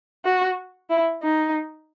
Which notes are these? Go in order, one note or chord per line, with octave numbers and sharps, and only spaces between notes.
F#4
E4
D#4